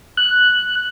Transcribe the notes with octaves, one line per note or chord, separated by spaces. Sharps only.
F#6